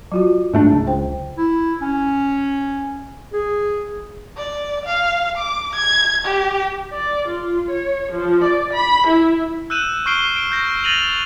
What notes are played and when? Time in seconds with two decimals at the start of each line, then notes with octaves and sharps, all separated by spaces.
0.12 F#3 F4 F#4
0.53 G#2 A3 D4
0.72 C#2
0.87 C5 G5
1.37 E4
1.82 C#4
3.33 G#4
4.37 D5
4.86 F5
5.38 D6
5.75 G#6
6.25 G4
6.95 D5
7.29 F4
7.71 C#5
8.13 F3
8.44 D5
8.76 B5
9.08 E4
9.70 E6 F#6 G6 D#7 E7 F#7
10.06 C#6 F6 G6 C7 D7 G7
10.36 D7
10.52 G6 A#6
10.84 G6 A6 A#6 D#7 F7 F#7